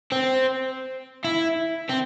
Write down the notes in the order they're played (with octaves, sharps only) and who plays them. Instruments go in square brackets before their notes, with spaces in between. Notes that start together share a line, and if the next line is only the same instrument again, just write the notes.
[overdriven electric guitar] C4
E4
C4